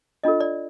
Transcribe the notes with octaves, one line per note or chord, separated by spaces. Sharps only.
D4 F4 A4 D#5
D5